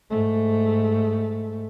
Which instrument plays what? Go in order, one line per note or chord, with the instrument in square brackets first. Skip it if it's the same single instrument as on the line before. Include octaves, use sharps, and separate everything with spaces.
[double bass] G#2 A3